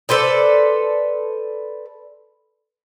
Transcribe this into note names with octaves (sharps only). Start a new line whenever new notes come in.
A4 B4 C5 D5